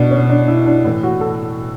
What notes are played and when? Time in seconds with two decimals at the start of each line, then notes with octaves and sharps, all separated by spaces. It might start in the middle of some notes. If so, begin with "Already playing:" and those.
Already playing: B2 D4
0.11 C#4
0.30 D4
0.48 E4
0.66 D4
0.85 A2 E3
1.03 F#4
1.21 A4